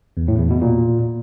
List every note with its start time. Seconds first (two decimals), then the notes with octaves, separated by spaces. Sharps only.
0.17 E2
0.28 A2
0.39 E2
0.50 B2
0.62 A#2